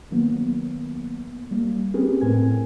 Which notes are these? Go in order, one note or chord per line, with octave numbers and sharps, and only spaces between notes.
D#3 F#3 A#3 B3
G3 A#3
C4 C#4 G4 G#4 A#4 B4
A2 A3 C4 A#4 G#5 G#6